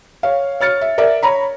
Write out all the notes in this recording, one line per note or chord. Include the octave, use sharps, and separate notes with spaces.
C#5 F5
C#5 F6 A6 C#7
E5
A#4 D5 E5
C#5 A#5 B5